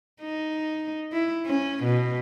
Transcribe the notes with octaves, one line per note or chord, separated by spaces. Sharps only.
D#4
E4
C#4
B2